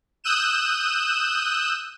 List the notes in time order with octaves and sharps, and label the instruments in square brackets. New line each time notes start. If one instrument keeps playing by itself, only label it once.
[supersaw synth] D#6 E6 F#6 G6 D#7 E7